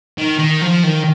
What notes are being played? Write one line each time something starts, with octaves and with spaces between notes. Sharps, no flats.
D#3
D#3
F3
D#3